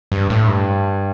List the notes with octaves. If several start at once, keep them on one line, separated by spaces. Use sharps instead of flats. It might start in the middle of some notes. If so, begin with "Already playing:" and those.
G2
A2
G2